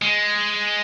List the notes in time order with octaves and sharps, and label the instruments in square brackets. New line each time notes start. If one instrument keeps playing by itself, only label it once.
[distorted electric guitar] G#3